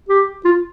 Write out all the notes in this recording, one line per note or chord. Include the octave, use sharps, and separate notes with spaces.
G4
F4